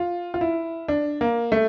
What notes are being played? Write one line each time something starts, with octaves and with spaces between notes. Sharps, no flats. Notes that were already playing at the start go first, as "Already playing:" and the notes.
Already playing: F4
F4
E4
D4
A#3
A3